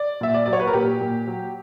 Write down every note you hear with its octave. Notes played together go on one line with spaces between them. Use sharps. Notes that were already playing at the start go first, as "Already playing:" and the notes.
Already playing: D5
A#2 E5
D5
F#3 D5
C#5
B4
A#4
A#2 G4
A#2
F#3